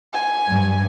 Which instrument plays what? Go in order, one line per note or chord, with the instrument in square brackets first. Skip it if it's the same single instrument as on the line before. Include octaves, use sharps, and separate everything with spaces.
[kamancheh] G#5
[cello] G2